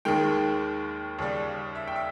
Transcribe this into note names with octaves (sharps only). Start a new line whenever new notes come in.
D#2 D#3 G#3 G5
D#2 C#3 G3
E5
G5
E5